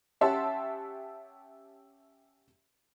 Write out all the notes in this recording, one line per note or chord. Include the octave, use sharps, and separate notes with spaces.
C#4 G4 E5 F#5 A5 C6